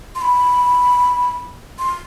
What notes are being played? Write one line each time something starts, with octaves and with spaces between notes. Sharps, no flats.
C6
B5
C6